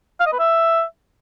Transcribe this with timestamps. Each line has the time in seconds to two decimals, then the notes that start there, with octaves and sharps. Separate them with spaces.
0.20 F5
0.26 D#5
0.33 B4
0.39 E5